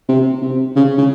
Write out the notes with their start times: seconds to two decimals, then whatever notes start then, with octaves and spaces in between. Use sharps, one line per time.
0.09 C3
0.42 C3
0.76 C#3
0.98 C#3